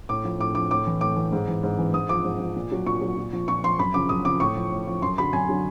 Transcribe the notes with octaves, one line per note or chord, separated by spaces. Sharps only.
A2 D6
F3
A2 D6
F3 D6
A2 D6
E3
A2 D6
E3
G#2
E3
G#2
E3
G#2 D#6
F3 D6
G#2
F3
A#2
F#3
A#2 C#6
F#3
A#2
F3
A#2 C#6
F3 C6
F#2 B5
C#3 F3 D6
F#2 D#6
C#3 F3 D6
A2 C#6
F3
A2
F3
F#2 C6
D3 F#3 B5
F#2 G#5
D3 F#3